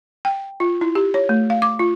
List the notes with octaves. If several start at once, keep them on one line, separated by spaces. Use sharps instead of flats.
G5
F4
E4
G4
C#5
A3
F5
D6
F4